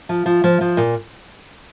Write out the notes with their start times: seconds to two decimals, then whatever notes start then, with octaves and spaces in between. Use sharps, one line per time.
0.09 F3
0.26 F3
0.44 F3
0.61 F3
0.77 A#2